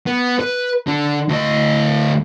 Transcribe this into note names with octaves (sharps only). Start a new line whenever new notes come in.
B3
B4
D3
D2 D#5